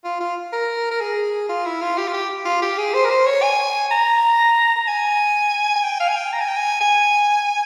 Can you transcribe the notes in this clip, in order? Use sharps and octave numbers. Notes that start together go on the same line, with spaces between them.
F4
F4
A#4
A#4
G#4
F4
E4
F4
G4
F4
G4
F4
G4
G#4
C5
A#4
C5
C#5
G#5
A#5
A#5
G#5
G#5
G5
F5
G#5
G5
A#5
G#5
G5
G#5
G#5